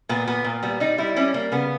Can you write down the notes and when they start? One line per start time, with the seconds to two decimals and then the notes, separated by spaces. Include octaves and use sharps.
0.09 A#2 B3
0.27 A#2 B3
0.45 A#2
0.63 G3 B3
0.80 G3 D#4
0.98 G3 E4
1.16 G3 C#4
1.34 G3 A#3
1.52 C#3 B3